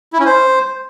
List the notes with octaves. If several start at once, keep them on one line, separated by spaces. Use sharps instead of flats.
E4
C#4
C5